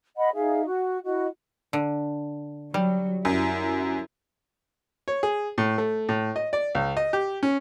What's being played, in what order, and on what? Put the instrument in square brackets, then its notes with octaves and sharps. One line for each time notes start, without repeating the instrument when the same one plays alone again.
[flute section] D#5 F#5 B5
D#4 G#4 E5 F5
F#4
E4 F#4 D#5
[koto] D3
[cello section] F#3 [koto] G3
[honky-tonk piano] F#2 [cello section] E4
[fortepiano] C#5
G#4
A2
A3
A2
D#5
D5
C#2
D#5
G4
C#4